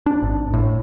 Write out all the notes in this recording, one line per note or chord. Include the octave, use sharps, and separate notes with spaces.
D4
G#1
A2